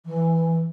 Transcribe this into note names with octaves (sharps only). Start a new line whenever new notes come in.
E3